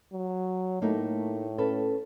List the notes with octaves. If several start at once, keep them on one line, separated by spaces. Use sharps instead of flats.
F#3
A2 A3 A#3 D#4
C#4 A4 B4